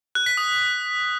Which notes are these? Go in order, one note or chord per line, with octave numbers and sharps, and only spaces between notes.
F#6
B6
D#6